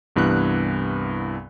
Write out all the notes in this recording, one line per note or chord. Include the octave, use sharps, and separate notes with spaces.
C2 G2 E3 B3 F#6